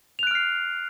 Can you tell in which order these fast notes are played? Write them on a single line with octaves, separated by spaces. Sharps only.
F7 F#6 D7 F6 C7